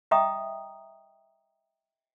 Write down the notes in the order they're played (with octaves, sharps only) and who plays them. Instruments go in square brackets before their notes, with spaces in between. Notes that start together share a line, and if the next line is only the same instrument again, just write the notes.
[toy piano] D#5 E5 G5 A#5 C#6 D#6